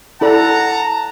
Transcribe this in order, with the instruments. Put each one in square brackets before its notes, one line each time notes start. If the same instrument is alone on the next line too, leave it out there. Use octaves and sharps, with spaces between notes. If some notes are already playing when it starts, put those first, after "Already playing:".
[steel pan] E4 A4 D5 [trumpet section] F#5 A5 A#5